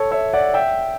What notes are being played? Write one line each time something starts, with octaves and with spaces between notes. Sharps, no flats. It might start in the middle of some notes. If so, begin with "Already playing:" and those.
Already playing: A4 C#5
C#5 E5
D5 F#5
E5 G5